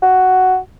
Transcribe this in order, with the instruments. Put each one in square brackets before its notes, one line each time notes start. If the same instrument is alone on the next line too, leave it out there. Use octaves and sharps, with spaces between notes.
[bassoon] F#4